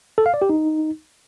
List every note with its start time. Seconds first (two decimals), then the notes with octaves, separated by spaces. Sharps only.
0.18 A4
0.26 F5
0.34 D5
0.42 G4
0.50 D#4